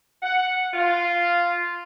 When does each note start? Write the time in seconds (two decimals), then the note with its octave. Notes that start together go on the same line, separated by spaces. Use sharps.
0.22 F#5
0.74 F4